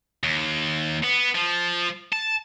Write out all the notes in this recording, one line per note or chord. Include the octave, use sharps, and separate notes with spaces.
D#2
B3
F3
A5